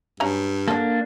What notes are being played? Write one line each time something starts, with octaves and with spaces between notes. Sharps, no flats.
G2 F#3 C#4 A#5
D3 A#3 D4 A4